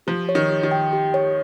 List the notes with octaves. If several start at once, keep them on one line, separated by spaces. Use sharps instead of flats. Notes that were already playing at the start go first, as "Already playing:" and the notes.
F3 G4
C#5
D#3
G4
D#3
G5
G4
C#5